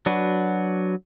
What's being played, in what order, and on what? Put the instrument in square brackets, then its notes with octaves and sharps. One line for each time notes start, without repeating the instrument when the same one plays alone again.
[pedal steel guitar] F#3 D4 F#4 B4